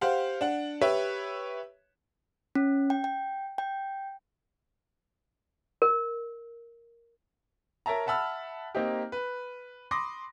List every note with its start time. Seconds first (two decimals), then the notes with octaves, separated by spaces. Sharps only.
0.01 G4 C5 F5 F#5
0.41 D4 F#5
0.81 G4 B4 C#5 E5
2.55 C#4
2.90 G5
3.04 G5
3.58 G5
5.82 A#4
7.86 A#4 C#5 E5 A5 A#5
8.06 E5 F#5 A5 B5 E6 F6
8.75 A#3 C4 D#4 G4
9.12 B4
9.91 B5 C6 D6 D#6 A#6